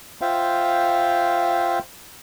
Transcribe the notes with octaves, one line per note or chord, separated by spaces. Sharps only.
F4 C5 E5 F5 G5